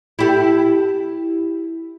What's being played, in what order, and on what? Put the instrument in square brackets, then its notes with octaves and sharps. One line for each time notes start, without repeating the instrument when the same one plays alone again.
[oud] E4 G4 A4